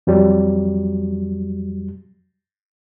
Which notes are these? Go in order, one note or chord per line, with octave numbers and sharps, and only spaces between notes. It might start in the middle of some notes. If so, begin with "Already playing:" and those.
F2 F#3 G3